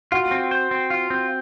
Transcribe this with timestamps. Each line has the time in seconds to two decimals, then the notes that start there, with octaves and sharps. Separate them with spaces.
0.12 F4 F#4
0.31 C4
0.51 C5
0.71 C4
0.90 F4
1.10 C4